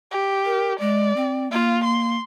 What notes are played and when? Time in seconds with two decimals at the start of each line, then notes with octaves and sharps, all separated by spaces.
0.11 G4
0.45 A#4
0.80 G#3 D5
1.16 C4
1.51 A#3 F4
1.85 C6